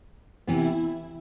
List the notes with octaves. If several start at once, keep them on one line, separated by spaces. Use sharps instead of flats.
C3 E3 B3 E4